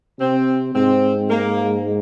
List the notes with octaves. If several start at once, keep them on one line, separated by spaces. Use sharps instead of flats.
C3 C4
G#2 C4
A#3